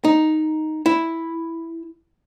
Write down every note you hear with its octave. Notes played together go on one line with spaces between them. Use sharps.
D#4
E4